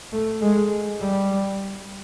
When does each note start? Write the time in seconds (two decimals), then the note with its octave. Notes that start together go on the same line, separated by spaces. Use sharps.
0.12 A3
0.41 G#3
1.00 G3